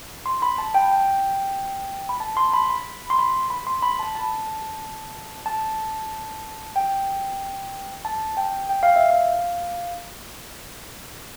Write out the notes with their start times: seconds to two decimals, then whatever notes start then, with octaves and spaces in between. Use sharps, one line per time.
0.26 C6
0.42 B5
0.58 A5
0.74 G5
0.91 G5
2.09 B5
2.20 A5
2.37 C6
2.53 B5
2.70 B5
3.10 C6
3.19 B5
3.50 B5
3.67 C6
3.82 B5
3.99 A5
4.15 A5
5.46 A5
6.76 G5
8.05 A5
8.37 G5
8.69 G5
8.83 F5
8.96 E5
9.10 F5